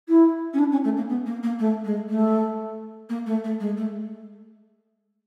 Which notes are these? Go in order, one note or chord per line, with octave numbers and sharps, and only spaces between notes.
E4
C#4
D4
C#4
A3
A#3
B3
A#3
A#3
A3
G#3
A3
A#3
A3
A3
G#3
A3